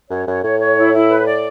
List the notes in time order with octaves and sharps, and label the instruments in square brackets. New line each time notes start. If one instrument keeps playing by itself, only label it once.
[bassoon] F#2 [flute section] C#5
[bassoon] F#2 [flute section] C#5
[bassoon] A2 [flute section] C#5
[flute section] C#5
E4
E4
B4
D5